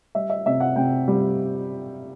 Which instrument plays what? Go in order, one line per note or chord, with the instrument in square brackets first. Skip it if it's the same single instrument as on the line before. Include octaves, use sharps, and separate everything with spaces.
[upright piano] G3 E5
E5
C3 E5
F#5
C3 G5
G3